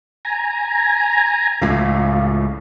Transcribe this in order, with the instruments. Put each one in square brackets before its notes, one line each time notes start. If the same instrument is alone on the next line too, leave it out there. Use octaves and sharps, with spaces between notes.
[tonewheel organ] G#5 A#5
[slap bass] C#2 A2 [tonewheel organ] F4